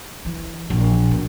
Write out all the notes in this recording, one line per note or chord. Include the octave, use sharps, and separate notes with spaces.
E3
A#1
B2